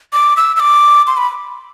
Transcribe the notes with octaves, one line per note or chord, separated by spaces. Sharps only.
D6
E6
E6
D6
C6
B5